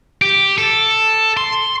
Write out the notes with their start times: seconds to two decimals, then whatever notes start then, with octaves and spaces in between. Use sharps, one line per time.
0.22 G4
0.58 A4
1.37 C6